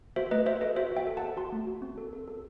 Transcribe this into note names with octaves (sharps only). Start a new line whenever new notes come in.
F#4 C5 E5
A3 B4 D#5
F#4 C5 E5
A4 B4 D#5
F#4 C5 E5
F#4 E5 G5
A4
A4 F#5 A5
F#4 A5 C6
A3
F#4
C4
A4
A4
A4